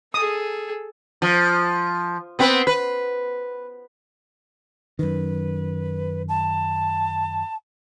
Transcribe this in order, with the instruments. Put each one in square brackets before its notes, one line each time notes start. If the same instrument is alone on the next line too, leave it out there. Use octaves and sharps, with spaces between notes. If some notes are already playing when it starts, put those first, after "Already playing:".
[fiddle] G#4 A4 [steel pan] D#6
[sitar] F3
B3 C4 B4
B4
[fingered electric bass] F#2 D#3 [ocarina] B4
[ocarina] A5